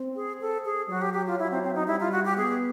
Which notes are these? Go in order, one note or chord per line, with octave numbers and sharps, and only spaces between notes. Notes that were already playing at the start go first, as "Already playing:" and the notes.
Already playing: C4
G#4
A4
G#4
F#3 F#4
G4
G4
F4
F#3 E4
C4
C4
D#4
G3 E4
F4
F#4
G4
B3 G#4